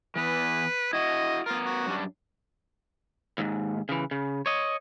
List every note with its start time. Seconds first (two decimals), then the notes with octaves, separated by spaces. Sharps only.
0.16 E3 B3 B4
0.93 E4 F#4 D#5
1.46 B3 F4 A#4
1.66 F#4
1.86 F#2 G3 D4
3.38 D#2 G#2
3.89 C#3 E3
4.11 C#3
4.46 C#5 D#5